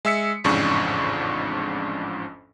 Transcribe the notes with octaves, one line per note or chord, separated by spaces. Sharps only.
G#3 E5 E6 B6 C#7
A1 F2 G#2 C#3 D4 C#6